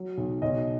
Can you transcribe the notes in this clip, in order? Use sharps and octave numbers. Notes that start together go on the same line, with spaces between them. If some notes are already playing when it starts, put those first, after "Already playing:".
Already playing: F#3
B1
B1 D#5